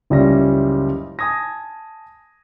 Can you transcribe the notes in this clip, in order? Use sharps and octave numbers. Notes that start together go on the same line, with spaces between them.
F#1 C#2 G3 C#4 E5 A#6
G#5 A5 D#6 G#6 A#6